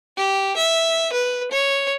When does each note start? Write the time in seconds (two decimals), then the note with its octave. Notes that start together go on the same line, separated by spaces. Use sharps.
0.17 G4
0.57 E5
1.13 B4
1.52 C#5